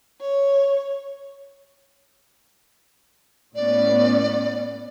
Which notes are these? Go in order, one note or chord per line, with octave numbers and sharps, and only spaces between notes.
C#5
A2 B3 C#4 D5